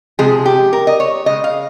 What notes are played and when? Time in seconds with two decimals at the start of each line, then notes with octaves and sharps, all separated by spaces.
0.19 C3 F3 G#3 G#4
0.46 G4
0.73 A#4
0.87 D#5
1.00 C#5
1.26 C#3 G#3 D#5
1.44 F5